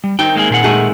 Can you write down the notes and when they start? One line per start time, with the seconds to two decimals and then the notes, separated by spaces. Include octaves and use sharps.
0.04 G3
0.19 D#3 C4 D#4 G5
0.36 G#3 A#3 G#4
0.50 A#2 G#4 F#5
0.64 D#3 G#3 A3